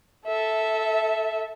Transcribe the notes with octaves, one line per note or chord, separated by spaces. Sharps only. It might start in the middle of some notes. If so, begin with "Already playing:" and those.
A4 E5